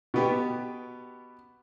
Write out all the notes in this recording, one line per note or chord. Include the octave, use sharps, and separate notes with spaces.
B2 B3 G4